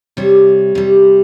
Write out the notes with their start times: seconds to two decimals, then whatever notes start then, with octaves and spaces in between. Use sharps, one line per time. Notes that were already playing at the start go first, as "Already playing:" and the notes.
0.17 C3 G3 C#5
0.75 C3 G3